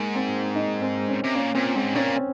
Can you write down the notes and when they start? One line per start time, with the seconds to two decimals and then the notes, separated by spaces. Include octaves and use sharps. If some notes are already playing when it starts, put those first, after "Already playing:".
Already playing: G#2 A#3
0.15 C4
0.55 D#4
0.82 C4
1.08 C#4
1.24 C3
1.35 A#2 C#4
1.55 A#2 C4
1.76 G#2 C4
1.95 A#2 C#4
2.16 C4